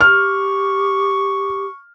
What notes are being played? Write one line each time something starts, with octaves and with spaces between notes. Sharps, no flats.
G4 C#6 F6